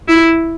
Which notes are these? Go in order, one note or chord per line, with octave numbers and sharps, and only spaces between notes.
E4